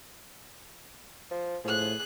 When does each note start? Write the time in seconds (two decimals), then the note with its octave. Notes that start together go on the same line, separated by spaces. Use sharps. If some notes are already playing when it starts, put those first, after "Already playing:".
1.31 F3
1.64 A2 F3 G#4 F#6